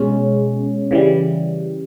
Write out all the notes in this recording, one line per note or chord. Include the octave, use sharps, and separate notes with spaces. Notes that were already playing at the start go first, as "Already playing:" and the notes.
Already playing: B2 G#3 C#4
C#3 E3 G3